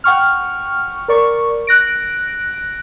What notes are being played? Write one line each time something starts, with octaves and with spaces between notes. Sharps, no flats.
F#5 G5 C#6 F6
A#4 D5 C#6
F#6 A#6 D7